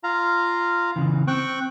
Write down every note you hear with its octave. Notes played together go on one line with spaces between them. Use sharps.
F4 F5 A#5
C#3 E3
C4 G5 C#6 F#6